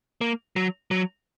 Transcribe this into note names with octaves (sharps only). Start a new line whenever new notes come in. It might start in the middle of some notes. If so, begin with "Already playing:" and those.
A#3
F#3
F#3